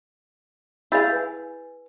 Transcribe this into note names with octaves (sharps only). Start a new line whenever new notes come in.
E4 G#4 F5 E6 G6 A6
B4 G#5